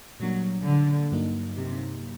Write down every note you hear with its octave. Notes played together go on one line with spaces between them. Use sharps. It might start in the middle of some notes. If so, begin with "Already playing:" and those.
A#2 F#3 G3 A#3 D4
D3
G2 F#3 A#3 D#4
C3